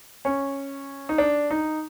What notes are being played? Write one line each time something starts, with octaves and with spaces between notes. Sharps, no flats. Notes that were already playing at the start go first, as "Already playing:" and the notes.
C#4
D#4
D4
D#4